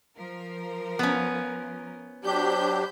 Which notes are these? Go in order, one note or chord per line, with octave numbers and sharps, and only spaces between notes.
F3 A#4
B3 C#4
F#3 D4 G4 C5 B5 G6